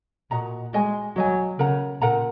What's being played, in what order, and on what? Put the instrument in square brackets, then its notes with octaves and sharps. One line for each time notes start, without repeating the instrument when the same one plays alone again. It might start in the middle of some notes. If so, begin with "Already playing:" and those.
[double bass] A#2 [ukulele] F#4 D#5 F#5 A#5
[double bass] G#3 [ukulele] F#4 D#5 G#5
[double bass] F#3 [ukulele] F#4 D#5 G#5
[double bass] C#3 [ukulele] A#4 F#5 A#5
[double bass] A#2 [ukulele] A#4 F#5 A#5